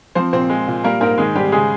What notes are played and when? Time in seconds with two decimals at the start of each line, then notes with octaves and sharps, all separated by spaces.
0.15 F3 C4 C5
0.33 A#2 C4 C5
0.50 G#3
0.67 A#2
0.84 G3 A#3 A#4
1.01 G#2 A#3 A#4
1.18 D#3 G#3 G#4
1.36 G#2 G3 G4
1.52 C#3 G#3 G#4